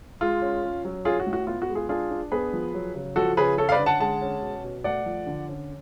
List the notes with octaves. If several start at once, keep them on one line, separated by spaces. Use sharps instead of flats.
G#3 F4
C#4
C#4
F#3
C#4 F4 G#4
F#4
A2
F#4
B3 F4
F#4
G#3
F4 G#4
D4 F4 G#4
D4
B3 G#4 B4
F3
F#3
C#3
F3 F#4 A4
C#3 G#4 B4
C#4 A4 C#5
F5
B4 D5
D3
F#5 A5
G#3 F#5 A5
C#4
B2
B2
A3 D5 F#5
F3
D3
C#4